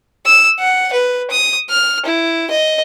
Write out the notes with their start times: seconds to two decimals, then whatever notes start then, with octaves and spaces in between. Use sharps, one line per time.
0.26 E6
0.59 F#5
0.93 B4
1.30 D#6
1.70 F6
2.06 E4
2.51 D#5